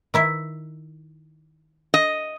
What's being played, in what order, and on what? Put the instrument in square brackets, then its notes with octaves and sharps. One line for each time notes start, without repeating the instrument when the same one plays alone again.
[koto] D#3 E4 E5
[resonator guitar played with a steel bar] D#5